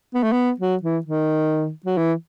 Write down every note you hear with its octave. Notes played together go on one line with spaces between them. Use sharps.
B3
A3
B3
F#3
E3
D#3
F#3
E3